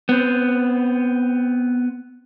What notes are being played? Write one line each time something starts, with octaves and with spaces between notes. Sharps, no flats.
B3 C4